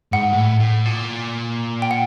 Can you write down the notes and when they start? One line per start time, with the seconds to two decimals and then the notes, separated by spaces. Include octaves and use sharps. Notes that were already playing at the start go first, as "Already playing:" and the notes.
0.13 G#2 F#5
0.33 A2
0.60 A2
0.85 A#2
1.82 G5
1.91 F#5